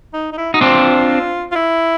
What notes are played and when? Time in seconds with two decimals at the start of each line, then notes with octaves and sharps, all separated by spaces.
0.14 D#4
0.33 D#4
0.38 E4
0.54 D#4 F#4
0.61 C4 D4 F4
1.52 F4
1.56 E4